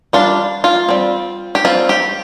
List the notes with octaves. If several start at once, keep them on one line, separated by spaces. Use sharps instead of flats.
G3 D4 F4
F4
G3 C4
G4
G3 C4 F4
G4